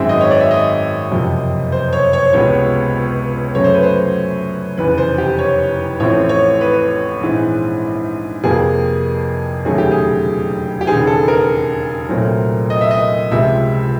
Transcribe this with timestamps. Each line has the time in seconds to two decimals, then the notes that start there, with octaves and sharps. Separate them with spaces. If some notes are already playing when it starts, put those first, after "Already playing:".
Already playing: G#1 F#2 D#3 G#3 C4 E5
0.09 D#5
0.21 C#5
0.31 D5
0.40 E5
0.51 D#5
1.11 F#1 F2 C3 F3
1.72 C5
1.93 C#5
2.13 C#5
2.25 C5
2.33 C#2 C3 F3 G#3 B3 C#5
3.55 F#2 C#3 F#3 A3 C#5
3.64 C5
3.74 B4
3.83 C5
4.78 F1 E2 C#3 B4
4.98 C5
5.18 G4
5.39 C#5
6.00 A1 A2 F3 A3 C4 C#5
6.29 C#5
6.61 B4
7.21 A#1 G#2 E3 G#3 C4
8.44 F2 C3 F3 A#3 G#4
9.65 E1 D#2 C#3 F#3 A3 G#4
9.78 G4
9.91 G#4
10.81 G4
10.87 E1 D#2 C#3 G#4
11.07 A4
11.28 A#4
12.09 C2 A#2 F#3 A3 C4
12.70 D#5
12.81 E5
12.91 D#5
13.31 C#2 C3 F3 G#3 E5